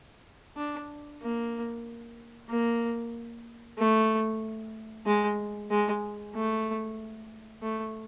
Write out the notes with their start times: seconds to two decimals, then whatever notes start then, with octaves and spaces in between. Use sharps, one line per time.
0.57 D4
1.22 A#3
2.49 A#3
3.78 A3
5.06 G#3
5.70 G#3
6.34 A3
7.62 A3